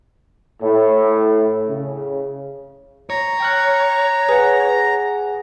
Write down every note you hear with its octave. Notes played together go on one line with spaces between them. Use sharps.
A2
C#3
C#5 A#5
G5 F6 F#6
G#4 B4 F#5